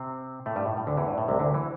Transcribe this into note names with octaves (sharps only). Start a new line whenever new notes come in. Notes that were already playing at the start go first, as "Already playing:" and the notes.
Already playing: C3 C4
A2 A3
G2 G3
A2
A2
D2 D3
E2 E3
G2
A2
C2 C3
D2 D3
E3